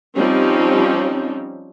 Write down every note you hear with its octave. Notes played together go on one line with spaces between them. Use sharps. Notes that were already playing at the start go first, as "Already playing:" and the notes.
F3 G3 C4 C#4 D#4